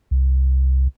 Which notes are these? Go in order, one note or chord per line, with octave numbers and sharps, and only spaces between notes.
C2